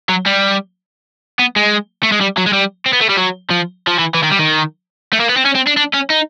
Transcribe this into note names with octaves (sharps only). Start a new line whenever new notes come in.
F#3
G3
B3
G#3
A3
G#3
G3
F#3
G#3
G3
C4
B3
A3
G3
F#3
F3
F3
E3
E3
D#3
G3
D#3
A3
A#3
B3
C4
C#4
C4
D4
D4
C#4
D#4